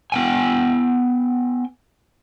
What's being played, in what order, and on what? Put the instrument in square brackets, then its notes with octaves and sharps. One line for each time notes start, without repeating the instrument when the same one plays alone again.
[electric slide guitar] B3 G5 G#5